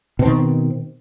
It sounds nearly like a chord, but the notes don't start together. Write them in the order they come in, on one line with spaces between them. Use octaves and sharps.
B2 C4 D#3